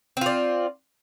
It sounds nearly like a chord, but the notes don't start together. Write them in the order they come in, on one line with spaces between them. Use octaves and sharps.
C4 F4 D5